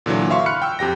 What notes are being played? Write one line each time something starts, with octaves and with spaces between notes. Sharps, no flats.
A#2 D3 E3 F#3
E5 F5 C6 C#6
B5 F6 F#6 C#7
G5 E6
F2 G4 G5 A#6